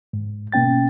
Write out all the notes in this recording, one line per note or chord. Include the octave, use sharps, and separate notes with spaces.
G#2
B2 A#3 C#4 G5 A6